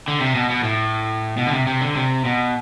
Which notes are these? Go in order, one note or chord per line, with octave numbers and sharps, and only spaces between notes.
D3
C3
B2
B2
A2
B2
D3
C3
C3
D3
C3
B2